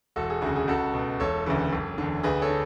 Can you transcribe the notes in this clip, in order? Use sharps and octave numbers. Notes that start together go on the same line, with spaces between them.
E1 F#4 A4
G#4
D2 C#3 F#4
G#4
C#2 F#4 A4
B2
E1 A4 C#5
D2 C#3 E3
F#1
E2 D3
D2 G#4 B4
A4 C#5
D3